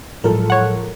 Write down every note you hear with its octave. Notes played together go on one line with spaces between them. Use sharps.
A2 F3 F#3 G#3 F4 A4 A#4
C#5 F#5